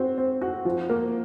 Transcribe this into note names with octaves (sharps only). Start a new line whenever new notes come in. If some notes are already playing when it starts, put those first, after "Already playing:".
Already playing: C4 F#4
C4
F#4
F3
A#3